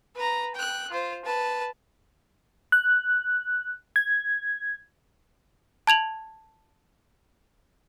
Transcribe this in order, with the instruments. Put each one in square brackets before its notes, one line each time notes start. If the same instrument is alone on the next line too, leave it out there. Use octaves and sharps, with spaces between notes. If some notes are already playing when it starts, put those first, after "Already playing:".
[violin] B4 A#5
G5 F#6
F4 C5
B4 A5
[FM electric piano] F#6
G#6
[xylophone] A5 G#6 F7 F#7